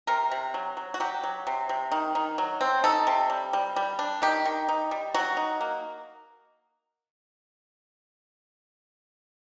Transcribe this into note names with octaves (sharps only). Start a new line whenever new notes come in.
C3 A#4
C3
F#3
F#3
F#4
F#3 G4
F#3
C3
C3
D#3
D#3
F#3
C4
D#4 A4
C3
G3
G3
G3
D4
D#3 G4
D#3
D#4
G3
F#3 F#4
D#4
A#3